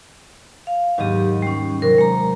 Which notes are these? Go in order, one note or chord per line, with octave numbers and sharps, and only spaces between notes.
F5
D#2 G#2 F#3 G4 D#7
G3 C#4
C3 F#3 A#4
G#3 A#5